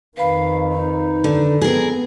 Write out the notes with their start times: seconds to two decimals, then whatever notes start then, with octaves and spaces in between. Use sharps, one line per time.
0.17 F2 D#3 B4 F5 B5
0.72 D#4
1.24 D3
1.61 B3 C4 G#4 A#4